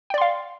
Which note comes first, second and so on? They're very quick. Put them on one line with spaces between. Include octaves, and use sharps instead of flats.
G5 D5 C6 F5